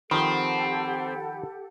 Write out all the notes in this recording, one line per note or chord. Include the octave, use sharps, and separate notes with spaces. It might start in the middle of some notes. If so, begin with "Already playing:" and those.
D#3 F3 C4 G4 A4 F#5 B5